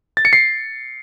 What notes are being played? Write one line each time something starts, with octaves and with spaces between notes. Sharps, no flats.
A6
C#7
C7